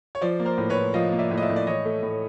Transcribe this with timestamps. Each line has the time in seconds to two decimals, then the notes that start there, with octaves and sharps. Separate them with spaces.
0.15 C#5
0.21 F3 C5 D5
0.40 A#3
0.45 A#4 C5
0.58 A2
0.70 B4 C#5
0.77 A2
0.94 F3 D#5 F5
1.12 A#3
1.19 D5 E5
1.31 A2
1.38 D#5
1.42 D5 E5
1.49 A2
1.56 D5
1.67 E3 C#5 D#5
1.85 A3
2.03 A2